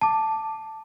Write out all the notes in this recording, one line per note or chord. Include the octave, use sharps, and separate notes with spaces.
A5 D6